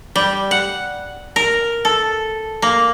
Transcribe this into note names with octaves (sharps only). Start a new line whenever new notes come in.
G3
F#5
A#4
A4
A#3